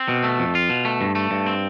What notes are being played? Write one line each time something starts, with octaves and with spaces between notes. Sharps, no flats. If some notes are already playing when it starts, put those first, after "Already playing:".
Already playing: C4
B2
A3
F2
F4
B2
A3
G2
A3
G2
C4